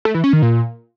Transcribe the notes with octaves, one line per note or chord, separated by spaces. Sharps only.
A3
E3
C#4
D#3
A#2